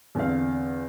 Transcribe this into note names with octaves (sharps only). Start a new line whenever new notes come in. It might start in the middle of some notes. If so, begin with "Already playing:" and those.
E2 D3 C4 F5